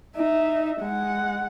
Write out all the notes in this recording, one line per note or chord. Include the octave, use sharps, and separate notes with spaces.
D#4 E5
G#3 F#5